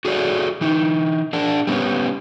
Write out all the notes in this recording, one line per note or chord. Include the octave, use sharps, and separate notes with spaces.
F#4 G#4 A4 C#5 D5
E3 D#4
D4 G#4 A#4
G3 B3 C#4